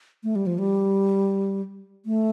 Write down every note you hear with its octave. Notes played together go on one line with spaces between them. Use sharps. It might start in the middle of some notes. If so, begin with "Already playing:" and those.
A3
G3
F3
G3
A3